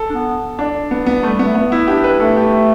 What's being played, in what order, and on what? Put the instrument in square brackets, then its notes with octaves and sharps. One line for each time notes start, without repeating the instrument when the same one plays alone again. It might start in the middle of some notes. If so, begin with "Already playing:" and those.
Already playing: [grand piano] A4
[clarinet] D4
B3
[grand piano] D4
B3
B3
[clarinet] G3 [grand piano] A3
[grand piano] B3
[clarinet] A3
[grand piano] B3
[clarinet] B3
[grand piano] E4
[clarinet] D4 [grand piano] G4
[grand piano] B4
[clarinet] A3 [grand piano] A4
[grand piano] G4